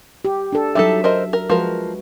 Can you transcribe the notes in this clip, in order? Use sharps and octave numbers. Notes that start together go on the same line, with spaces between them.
G4
D4 A4
F#3 G3 D#4 A4 E5
A#4 C5 D#5
A#4
F3 G#3 F#4 A#4 B4